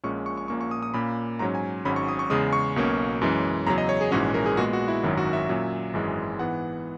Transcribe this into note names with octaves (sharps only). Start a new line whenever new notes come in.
A#1 A#2 G#3 C#4 C#6
C#6
C#6
A#1 A#2 A#3 C#4 C#6
C#6
D#6
D#6
A#2 A#3 C#4 B5
G#2 F#3 C#4 A#5
G#5
G#1 G#2 F#3 C#4 B5
C#6
D#6
C#6
E2 C#3 G#3 D#6
C#6
B1 B2 A#3 C#4
F#2 E3 G#3 C#4
E2 C#3 F#3 A#5
D#5
C#5
G#4
A#1 G#2 E3 G#3 C#4 F#4
A#4
G#4
A#2 G#3 B3 F#4
F#4
E4
G#1 F#2 D#3 F#3 E4
F#4
E5
A#2 F#3 C#4
G#1 F#2 E3 G#3
G#2 E3 B3 F#5